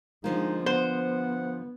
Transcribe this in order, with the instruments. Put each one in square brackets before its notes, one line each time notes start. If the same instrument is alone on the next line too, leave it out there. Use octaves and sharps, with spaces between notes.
[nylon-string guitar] D3 F3 A#3 [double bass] G#3 [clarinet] D#4
[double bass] B3 [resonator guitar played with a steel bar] C5 [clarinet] F#5